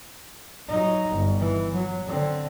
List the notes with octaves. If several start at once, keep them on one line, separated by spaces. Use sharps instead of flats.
F#3 D#4
G1
E3
F#3
D3 C4